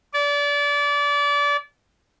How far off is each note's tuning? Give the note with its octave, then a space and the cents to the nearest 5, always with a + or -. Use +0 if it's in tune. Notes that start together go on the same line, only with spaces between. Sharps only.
D5 -30